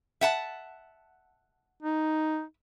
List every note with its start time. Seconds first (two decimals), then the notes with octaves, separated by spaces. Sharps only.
0.21 E5 F#5 A5
1.82 D#4